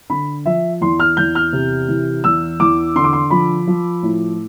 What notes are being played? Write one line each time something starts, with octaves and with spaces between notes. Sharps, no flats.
D3 B5
F3 E5
E2 C6
F6
E2 G6
F6
C3
E3
E2 E6
E2 D6
D3 C6
D6
C6
F3 B5
F3
A2